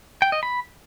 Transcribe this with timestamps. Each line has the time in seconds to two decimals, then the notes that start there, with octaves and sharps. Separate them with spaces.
0.22 G5
0.32 D#5
0.43 B5